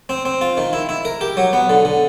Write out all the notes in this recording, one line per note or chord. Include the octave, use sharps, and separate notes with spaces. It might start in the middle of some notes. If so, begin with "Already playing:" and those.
C4
C4
F4
D#3
E4
E4
A#4
G4
F#3
B3
D3
D3